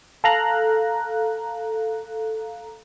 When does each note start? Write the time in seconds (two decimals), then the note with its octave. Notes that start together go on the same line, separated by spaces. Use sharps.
0.24 A4 F5 A#5 F#6